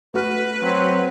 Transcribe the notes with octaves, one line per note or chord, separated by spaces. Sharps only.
A3 F#4 B4 F6
F#3 C4